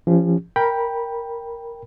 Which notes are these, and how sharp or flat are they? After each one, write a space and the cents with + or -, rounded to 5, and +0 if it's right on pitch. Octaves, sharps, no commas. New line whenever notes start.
F3 -30 C#4 +0 G4 +40
A#4 +0 G5 +5 B5 -15